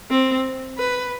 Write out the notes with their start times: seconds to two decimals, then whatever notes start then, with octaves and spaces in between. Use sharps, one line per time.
0.11 C4
0.78 B4